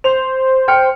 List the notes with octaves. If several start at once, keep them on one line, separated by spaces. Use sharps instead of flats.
C5 F7
G5 F6 C#7